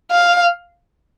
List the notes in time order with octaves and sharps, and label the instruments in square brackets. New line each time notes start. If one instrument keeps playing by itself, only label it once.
[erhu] F5